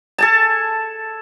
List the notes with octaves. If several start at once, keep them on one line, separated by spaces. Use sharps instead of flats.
A4 G#5 A5